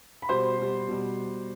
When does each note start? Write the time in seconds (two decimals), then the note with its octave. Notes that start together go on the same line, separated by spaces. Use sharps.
0.22 B5
0.29 B2 G3 C5 C6
0.58 B2 G3
0.87 B2 G3